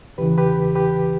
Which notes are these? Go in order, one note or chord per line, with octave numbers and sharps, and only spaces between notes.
E2 C#3 E3 G4 B4
G4 B4
G4 B4